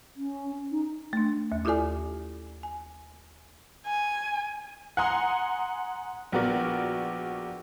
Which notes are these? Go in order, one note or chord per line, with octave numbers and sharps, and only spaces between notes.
C#4
D#4
A3 D4
D#2
E4 F4 G4 A4 D5 G#5
G#5
G#5
F#5 G#5 A#5 C6 D#6
A#1 B3 F#4 A#4 D5